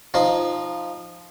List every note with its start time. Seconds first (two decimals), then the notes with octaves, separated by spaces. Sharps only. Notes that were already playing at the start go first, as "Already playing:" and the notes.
0.14 F3 D#4